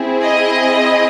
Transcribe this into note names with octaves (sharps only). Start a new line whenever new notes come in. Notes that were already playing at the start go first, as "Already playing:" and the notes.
Already playing: C4 E4 G#4
D#5